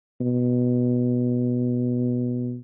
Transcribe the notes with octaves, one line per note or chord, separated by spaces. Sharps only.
B2